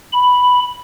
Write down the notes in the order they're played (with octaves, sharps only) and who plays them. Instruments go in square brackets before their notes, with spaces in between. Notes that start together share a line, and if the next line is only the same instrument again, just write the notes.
[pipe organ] B5